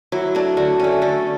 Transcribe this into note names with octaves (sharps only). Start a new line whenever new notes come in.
F#3 E4
A3 D4
D3 F#4
A3 C#4
D3 A4